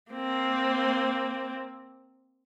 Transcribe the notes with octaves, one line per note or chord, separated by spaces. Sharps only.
A#3 C4